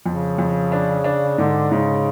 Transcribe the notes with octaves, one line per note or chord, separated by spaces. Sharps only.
F2 C#3
F2
D4
D4
G#2 D3
G#2 C#3